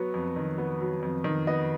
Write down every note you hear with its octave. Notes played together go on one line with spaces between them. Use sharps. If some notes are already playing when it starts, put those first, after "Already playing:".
Already playing: F#3 B3 C#6
F2
D#3
B3
F#3
F2
D#3
B3 D#5